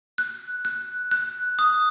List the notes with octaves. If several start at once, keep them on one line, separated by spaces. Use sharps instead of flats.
F#6
F#6
F#6
D#6